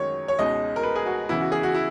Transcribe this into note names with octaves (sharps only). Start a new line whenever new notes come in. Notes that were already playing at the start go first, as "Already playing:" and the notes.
Already playing: F#2 D#3 G#3 D#4 C#5
C#5
C#2 B2 G#3 D#4 D#5
A#4
B4
G#4
F#4
C#3 E3 B3 E4
F#4
G#4
F#4
E4